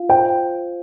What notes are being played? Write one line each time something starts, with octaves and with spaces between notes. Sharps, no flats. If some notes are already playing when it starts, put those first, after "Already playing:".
Already playing: F4 F5
C5 G5